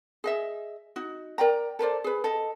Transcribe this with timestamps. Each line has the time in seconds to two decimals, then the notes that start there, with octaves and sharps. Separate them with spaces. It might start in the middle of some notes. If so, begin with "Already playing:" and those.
0.24 G#4 D#5 E5
0.96 D#4 F#4
1.38 A#4 D5 G5 A#5
1.79 A4 A#4 C5 D5
2.04 G#4 B4
2.24 A4 D#5